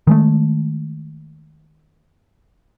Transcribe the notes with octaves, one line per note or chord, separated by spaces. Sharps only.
D#3 G#3 A3